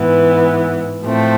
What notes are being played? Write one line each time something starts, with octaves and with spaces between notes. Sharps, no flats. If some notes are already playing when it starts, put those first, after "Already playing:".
Already playing: G#2 E3 B3
A2 F3 A3 C4